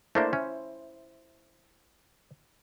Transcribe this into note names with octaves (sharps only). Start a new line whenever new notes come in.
A3 A#3 D4 E4 C5
C#4